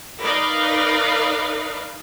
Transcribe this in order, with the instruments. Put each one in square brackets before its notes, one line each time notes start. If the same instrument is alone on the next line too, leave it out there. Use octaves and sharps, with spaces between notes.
[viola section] D#4 A#4 B4 D5 D#5 F5